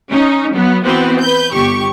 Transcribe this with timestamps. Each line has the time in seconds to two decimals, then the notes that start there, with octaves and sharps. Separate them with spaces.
0.10 C#4 D#4
0.52 F#3 B3
0.84 E3 B3 C4 F#4 B4
1.20 B4 G6
1.53 G1 G4 C#6